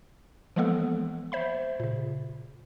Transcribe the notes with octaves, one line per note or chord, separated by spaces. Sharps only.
E3 F3 G#3 A#3 B3 A4
C5 E5 B5
A#2 C#3